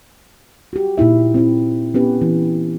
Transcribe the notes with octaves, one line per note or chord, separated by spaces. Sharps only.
F#4 G4
A#2 D#4 E4 E5
C4 E4
B3 C#4 G4 B4
E3